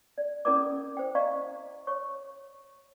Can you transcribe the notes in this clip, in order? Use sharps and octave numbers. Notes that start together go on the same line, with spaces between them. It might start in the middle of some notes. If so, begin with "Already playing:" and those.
D5
C#4 E4 A4 A#4 D5 D6
C5 G5
D5 D#5 F5 A#5 C#6
C#5 C#6